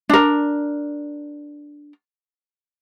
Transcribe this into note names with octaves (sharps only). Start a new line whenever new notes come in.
D4 A#4